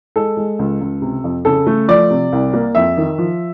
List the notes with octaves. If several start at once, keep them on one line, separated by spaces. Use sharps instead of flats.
G#3 A4
G#3
C#2
C#2
C3
F2
C#3 A4
A3
F3 D5
C3
C2
A#3
F2 E5
D#3
F3